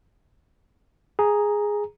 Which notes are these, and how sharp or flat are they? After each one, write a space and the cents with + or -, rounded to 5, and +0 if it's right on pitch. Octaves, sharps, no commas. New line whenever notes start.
G#4 +0 A#5 +0